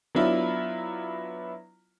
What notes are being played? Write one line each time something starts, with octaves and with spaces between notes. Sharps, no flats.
F#3 B3 D4 E4 F4